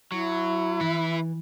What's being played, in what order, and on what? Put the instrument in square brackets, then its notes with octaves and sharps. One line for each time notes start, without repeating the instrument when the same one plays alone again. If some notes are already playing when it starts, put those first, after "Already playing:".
[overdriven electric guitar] F#3 [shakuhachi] E4
[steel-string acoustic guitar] E3 [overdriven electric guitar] B4 E5